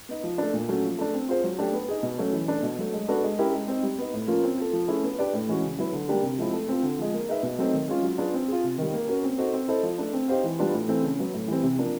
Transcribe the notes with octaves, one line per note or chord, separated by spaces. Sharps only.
B3 D#4
F3
A3 D4
A#2
F#3 A3 C#4 F#4
F3
A3 D4
C4
F4 G#4 C5
F#3
A3 D4 G4
B3
D#4 G#4
B2
F#3 A3 C#4
E3
A3 D4
B2
F#3 A3
G#3
B3 D4 F#4 A4
G#3
C#4 E4 G4 A#4
G#3
C4 D#4
G3
B3 D#4
A2
F3 A#3 C#4 F4
C4
F4 A4
F3
A3 C#4 E4 G#4
B3
D4 G4 B4 D5
A2
E3 G#3 C#4 F#4
C#3
F#3 B3 E4
D3
G3 A#3 D4 G4
C3
F3 G#3 C4 E4
A3
C4 F4
D3
F3 G#3
A#3
D#4 G#4 B4 E5
B2
F#3 A3 C4 D#4
D#3
G#3 C#4 F4
F#3
B3 D4 F4 G#4
C4
F4 G#4
C3
D#3 G3
A#3
C#4 F#4 A#4
C4
D#4 F#4 A4 C5
C4
E4 A4 C5 D#5
F3
A3 D4
C4
D#4 G4 C5 F5
E3
G3 B3 D4 F4
A2
E3 A3 C4
C#3
F#3 B3
A2
E3 G3 C4
C3
F3 A#3 D4